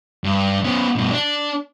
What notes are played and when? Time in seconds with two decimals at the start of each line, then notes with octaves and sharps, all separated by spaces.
0.24 G2
0.64 B3 C#4
0.96 G2 B2
1.11 D4